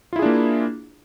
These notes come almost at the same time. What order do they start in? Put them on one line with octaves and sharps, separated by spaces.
F4 E4 G#4 D4 A#3